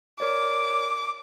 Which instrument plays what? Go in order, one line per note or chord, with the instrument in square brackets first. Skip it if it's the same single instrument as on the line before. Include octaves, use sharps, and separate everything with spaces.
[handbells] A#4 C#5 D5 [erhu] D6